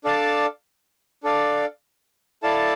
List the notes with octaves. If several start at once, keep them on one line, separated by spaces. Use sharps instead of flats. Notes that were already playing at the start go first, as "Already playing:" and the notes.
D4 A4 D5 F5 A5
D4 A4 D5 F5
E4 A4 D5 F5 A5